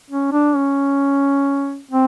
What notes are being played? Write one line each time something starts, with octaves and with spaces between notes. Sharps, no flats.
C#4
D4
C#4
C4